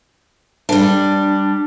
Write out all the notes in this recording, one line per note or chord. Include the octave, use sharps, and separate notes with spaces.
G3 D4